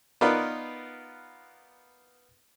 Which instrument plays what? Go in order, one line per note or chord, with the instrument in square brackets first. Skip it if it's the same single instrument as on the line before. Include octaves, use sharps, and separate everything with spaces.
[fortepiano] B3 D#4 F4 A#4 B4 D5